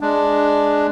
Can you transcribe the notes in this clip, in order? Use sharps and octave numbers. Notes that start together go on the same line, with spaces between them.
G#3 D4